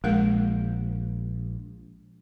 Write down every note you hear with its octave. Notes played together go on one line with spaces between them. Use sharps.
A#1 G#3 A#4 F#5